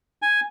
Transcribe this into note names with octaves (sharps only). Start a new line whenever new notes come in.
G#5